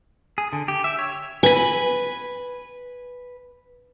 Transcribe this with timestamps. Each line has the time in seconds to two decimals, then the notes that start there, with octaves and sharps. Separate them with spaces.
0.38 G#4
0.53 D3
0.68 G4
0.84 E5
0.99 C#5
1.43 B4 G#5 B5